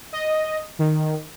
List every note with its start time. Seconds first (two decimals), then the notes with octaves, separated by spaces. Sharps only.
0.13 D#5
0.79 D#3